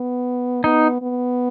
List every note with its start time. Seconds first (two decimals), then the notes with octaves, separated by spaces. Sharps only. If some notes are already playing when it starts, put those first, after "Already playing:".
Already playing: B3
0.64 B3 D#4
1.02 B3